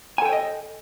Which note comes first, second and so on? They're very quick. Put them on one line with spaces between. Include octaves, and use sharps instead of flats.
G#5 A4 G5 C#5 D#5